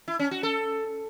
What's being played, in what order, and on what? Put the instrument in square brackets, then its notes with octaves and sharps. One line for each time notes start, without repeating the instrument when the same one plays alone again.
[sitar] E4
C#4
F#4
A4